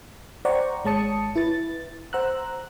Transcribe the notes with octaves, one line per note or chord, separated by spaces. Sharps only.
C5 D5 F#5 G5 A#5 C#6
G#1 G#3 C#5 A5 D#6 C#7
E4 B4 A6
C5 F#5 A#5 E6 F#6